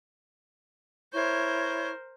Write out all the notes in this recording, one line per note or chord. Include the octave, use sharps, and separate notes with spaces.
E4 A#4 C5 C#5 C#6